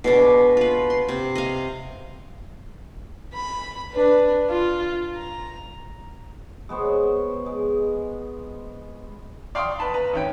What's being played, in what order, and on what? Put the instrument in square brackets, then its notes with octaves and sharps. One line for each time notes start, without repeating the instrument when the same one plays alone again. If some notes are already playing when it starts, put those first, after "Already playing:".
[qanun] B2 G#3 D4
F4 B4
C6
C3
D#5 F5
[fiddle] B5
D4 B4
F4
A#5
[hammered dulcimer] G#3 B3 C5 C#5
G#3
[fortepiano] D5 F5 G5 C6 C#6 D#6
B4 A5 B5
B4 A#5
G#1 C#4 G5